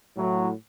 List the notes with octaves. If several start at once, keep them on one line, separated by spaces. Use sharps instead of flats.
A2 F#3